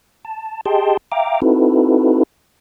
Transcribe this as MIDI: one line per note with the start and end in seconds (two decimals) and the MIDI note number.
0.25 0.61 81
0.66 0.97 67
0.66 0.97 68
0.66 0.97 75
0.66 0.97 79
0.66 0.97 81
0.66 0.97 84
1.12 1.40 76
1.12 1.40 77
1.12 1.40 79
1.12 1.40 82
1.12 1.40 86
1.42 2.23 60
1.42 2.23 63
1.42 2.23 64
1.42 2.23 66
1.42 2.23 69
1.42 2.23 71